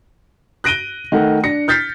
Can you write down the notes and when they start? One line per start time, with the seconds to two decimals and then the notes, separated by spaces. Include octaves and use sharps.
0.64 F#6 A#6 D7 D#7 G7
1.12 D#3 A3 F#5
1.44 D4 A#6 C#7
1.68 F6 G6 A6 B6 C7